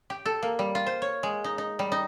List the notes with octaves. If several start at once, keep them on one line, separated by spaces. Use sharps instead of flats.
G4
A4
A#3
G3
F4
C5
C#5
G#3
D#4
D#4
G3
D#4